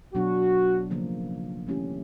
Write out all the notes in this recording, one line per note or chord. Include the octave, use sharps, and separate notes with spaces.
B2 F#3 B3 D4 F#4
C#3 F3 A#3
E3 A3 C#4 E4 G4